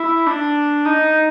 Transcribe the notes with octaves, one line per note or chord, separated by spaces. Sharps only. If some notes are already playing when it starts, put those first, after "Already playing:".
Already playing: E4
D4
D#4